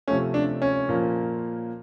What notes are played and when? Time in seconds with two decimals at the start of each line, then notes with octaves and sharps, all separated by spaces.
0.08 C3 F3 A3 C#4
0.34 D4
0.62 C#4
0.89 A#2 F3 A#3